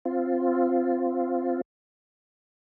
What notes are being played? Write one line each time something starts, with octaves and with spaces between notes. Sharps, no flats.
C4 F4